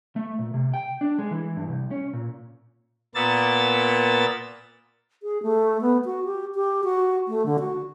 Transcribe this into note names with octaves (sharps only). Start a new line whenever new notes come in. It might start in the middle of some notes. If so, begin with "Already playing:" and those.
A3
A#2
C3
G5
D4
G#3
E3
G2
C2
C#4
A#2
A#2 A#3 B3 E6 A6
G#4
A3
B3
F#4
G4
G4
F#4
A3
D3
F#4